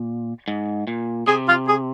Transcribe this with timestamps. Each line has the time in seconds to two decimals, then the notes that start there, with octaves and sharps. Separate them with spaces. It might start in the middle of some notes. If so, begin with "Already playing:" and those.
Already playing: A#2
0.48 G#2
0.87 A#2
1.27 C3 G#4
1.48 F4
1.67 G#4